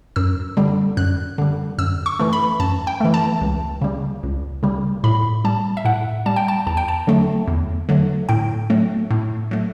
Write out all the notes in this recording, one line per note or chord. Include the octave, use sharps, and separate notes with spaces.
F#2 E6
D3 G3
F#2 F#6
D3 G3
F#2 E6
C#6
E3 A3
B5
F#2 A5
G5
E3 A3
A5
C#2
C#3 G3
C#2
C#3 G3
A2 B5
G3 A5
E5
A2 F#5
G3 A5
G5
A5
E2 A5
G5
A5
D3 F#3 A3
E2
D3 F#3 A3
A2 G5
F#3 A3
A2
F#3 A3